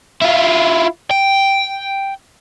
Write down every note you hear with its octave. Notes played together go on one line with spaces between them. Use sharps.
E4 F4
G5